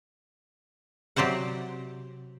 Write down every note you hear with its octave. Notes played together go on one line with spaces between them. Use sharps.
C3 F#3 G4 C5 D5 F#5